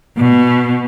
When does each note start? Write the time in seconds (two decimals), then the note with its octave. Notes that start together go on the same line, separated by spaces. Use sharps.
0.17 B2